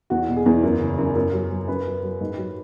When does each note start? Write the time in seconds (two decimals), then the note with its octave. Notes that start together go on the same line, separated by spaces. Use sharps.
0.10 E2 F#4
0.28 B2
0.37 G#4
0.46 E2
0.63 F#2
0.80 C#3
0.98 F#2
1.15 F#2
1.33 F#3
1.51 F#3
1.68 F#2 B4
1.86 F#3
2.03 F#3
2.21 G#2
2.38 F#3